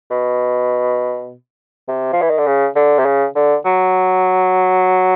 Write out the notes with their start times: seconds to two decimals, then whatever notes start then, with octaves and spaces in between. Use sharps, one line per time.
0.10 B2
1.88 C3
2.13 F3
2.21 E3
2.30 D#3
2.38 D3
2.47 C#3
2.76 D3
2.99 C3
3.05 C#3
3.35 D3
3.65 F#3